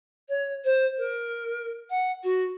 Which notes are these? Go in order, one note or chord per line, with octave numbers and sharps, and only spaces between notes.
C#5
C5
A#4
F#5
F#4